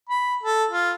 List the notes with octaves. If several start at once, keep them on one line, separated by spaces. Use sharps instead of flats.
B5
A4
F4